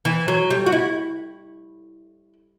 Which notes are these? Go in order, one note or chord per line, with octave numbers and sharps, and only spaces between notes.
E3
F#3
G3
F#4
E4